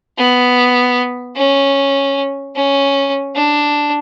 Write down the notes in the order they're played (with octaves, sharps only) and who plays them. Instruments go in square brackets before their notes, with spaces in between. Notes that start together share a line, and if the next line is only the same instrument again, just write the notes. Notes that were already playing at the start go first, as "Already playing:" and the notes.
[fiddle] B3
C#4
C#4
D4